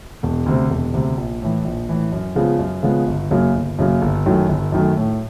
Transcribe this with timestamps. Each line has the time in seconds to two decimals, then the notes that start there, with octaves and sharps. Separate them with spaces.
0.23 E1
0.46 D2 C3
0.70 E1
0.94 D2 C3
1.17 A#1
1.42 A2 E3
1.64 A#1
1.89 A2 E3
2.12 F#2
2.35 C#3 F3 G#3 B3
2.59 F#2
2.83 C#3 F3 G#3 B3
3.07 G1
3.31 F#2 C#3 F#3 A#3
3.55 G1
3.79 F#2 C#3 F#3 A#3
4.02 G1
4.26 F#2 D#3 F#3 A3
4.49 G1
4.72 F#2 D#3 F#3 A3
4.97 A2